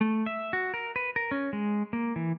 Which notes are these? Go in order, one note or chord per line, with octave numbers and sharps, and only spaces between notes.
A3
E5
F#4
A#4
B4
A#4
C#4
G#3
A#3
E3